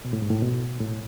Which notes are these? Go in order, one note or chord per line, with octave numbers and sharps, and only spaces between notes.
B2
A2
G#2
A2
B2
A2